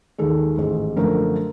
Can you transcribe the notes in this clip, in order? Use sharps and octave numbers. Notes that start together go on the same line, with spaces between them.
D#2 D#3 G#3 A4
A1 G#2 D#3 G#3
F#2 D3 F3 A3 A#4